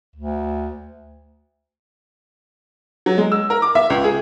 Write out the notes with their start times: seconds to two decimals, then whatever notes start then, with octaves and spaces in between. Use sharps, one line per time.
0.16 D2
3.06 F#3
3.18 G#3
3.32 E6
3.50 A#4
3.62 D6
3.75 E5
3.90 C#2
4.04 G#4